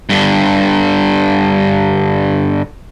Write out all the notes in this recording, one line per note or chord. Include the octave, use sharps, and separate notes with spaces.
G2 D3